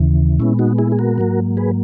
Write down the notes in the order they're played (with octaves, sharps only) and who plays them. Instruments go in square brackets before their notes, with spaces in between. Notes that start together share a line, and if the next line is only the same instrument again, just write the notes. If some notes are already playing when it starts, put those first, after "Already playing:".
Already playing: [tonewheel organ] D#2 C#3 E3
A#2 G#3 B3 C#4 E4
D#4 F#4
E4 G#4
G#4
F#4 A#4
G#2 F#3 A#3
G#4 B4